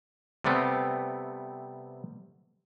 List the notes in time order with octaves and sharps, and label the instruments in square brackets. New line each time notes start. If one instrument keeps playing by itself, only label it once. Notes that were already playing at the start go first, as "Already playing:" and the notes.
[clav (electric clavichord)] C3 G3 A3 B3 C4